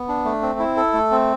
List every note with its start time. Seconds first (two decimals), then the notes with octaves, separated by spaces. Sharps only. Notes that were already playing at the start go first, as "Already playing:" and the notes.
Already playing: B3
0.08 D4
0.25 A3
0.42 C4
0.59 E4
0.77 A4
0.93 A3
1.11 C4